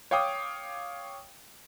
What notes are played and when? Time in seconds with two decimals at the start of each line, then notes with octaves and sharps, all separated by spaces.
0.11 C#5 F5 G5 D6 D#6